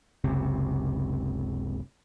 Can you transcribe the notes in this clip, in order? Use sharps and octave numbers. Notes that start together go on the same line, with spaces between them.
F#1 C#2 C3